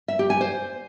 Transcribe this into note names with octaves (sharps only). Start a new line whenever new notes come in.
E5
G4
G#5
C5